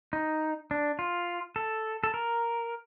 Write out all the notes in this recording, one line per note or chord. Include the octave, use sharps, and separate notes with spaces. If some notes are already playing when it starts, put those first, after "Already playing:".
D#4
D4
F4
A4
A4
A#4